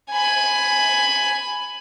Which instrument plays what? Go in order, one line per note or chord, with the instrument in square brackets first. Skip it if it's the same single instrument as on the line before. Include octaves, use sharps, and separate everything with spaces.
[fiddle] G#5 B5